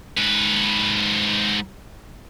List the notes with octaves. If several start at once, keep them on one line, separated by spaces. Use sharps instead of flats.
G#2 B4